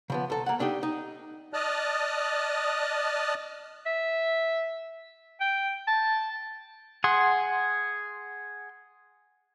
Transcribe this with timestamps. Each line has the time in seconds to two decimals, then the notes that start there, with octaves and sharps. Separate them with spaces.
0.10 C#3 F3 B3
0.30 C2 A4
0.46 A#3 F#5
0.59 A3 D4 D#4 G4
0.83 D#4
1.53 D5 D#5 A5 D#6 F6 F#6
3.86 E5
5.40 G5
5.88 A5
7.04 G#4 F#5 C6